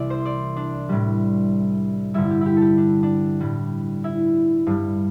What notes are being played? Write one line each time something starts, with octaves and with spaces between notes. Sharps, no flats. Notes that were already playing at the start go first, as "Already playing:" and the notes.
Already playing: C2 C3 E3 D5
C5
D5
D4
A2 G3
G2 D3 G3 E4
G4
E4 G4
G4 A4
D4
D4
A2 G3
E4
G2 G3